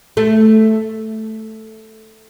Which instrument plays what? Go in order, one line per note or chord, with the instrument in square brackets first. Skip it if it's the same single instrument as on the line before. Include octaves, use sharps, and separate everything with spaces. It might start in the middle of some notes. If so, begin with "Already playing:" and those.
[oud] A3